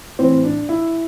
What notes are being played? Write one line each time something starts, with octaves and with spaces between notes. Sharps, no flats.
A2 E3 C4
D4
E4